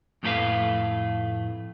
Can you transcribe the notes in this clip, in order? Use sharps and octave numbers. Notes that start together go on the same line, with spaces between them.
F2 A2 A3 A4 B4 F5